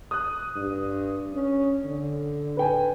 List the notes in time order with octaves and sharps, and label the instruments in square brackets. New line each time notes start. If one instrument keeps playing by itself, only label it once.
[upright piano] D#6 F#6
[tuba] G2
C#4
D3
[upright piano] B4 G5 G#5